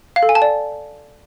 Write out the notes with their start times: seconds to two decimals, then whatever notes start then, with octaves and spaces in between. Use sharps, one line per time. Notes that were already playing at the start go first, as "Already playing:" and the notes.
0.16 F5
0.23 A4
0.29 G#5
0.35 A5
0.42 D5